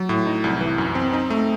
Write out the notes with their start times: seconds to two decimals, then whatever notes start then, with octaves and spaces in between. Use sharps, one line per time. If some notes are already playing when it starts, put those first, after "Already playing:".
Already playing: F#3
0.09 A2
0.26 D#4
0.44 C2
0.60 E3
0.78 F#2
0.95 C4
1.13 D#4
1.30 A3